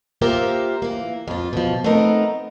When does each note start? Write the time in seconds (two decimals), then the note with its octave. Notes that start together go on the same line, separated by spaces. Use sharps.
0.22 A#3 F4 G4 A#4 C5 E5
0.82 E3 A#3
1.28 F2 F4
1.53 B2 F3
1.84 A3 B3 C4 D#4 A#4